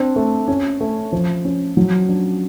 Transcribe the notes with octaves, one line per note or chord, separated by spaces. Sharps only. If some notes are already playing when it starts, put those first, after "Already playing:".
Already playing: C4 D4
A3
C#4
A3
F3
C#4
F#3
D4